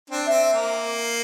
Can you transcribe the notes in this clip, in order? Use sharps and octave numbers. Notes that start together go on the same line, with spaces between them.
C4 D4
C4 E5
A#3